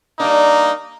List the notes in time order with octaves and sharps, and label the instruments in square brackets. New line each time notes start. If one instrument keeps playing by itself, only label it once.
[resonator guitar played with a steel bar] G3 D4 [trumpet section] A#3 D#4